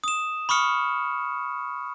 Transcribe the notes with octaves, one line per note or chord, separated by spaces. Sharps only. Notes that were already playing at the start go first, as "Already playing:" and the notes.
D#6 E7
B5 C#6 D#6 F6 C#7